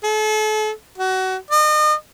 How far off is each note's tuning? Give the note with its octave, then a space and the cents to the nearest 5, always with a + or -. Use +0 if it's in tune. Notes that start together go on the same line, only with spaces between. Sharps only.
A4 -40
F#4 +25
D#5 -40